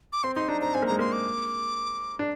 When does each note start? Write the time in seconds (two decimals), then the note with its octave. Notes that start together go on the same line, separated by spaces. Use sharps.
0.12 D6
0.23 C4 C6
0.35 D#4 C6
0.48 D4 A#5
0.61 C4 A#5
0.74 C4 G#5
0.82 A#3
0.86 G#3 A#5
0.99 A#3 C6
1.12 D6
2.19 D4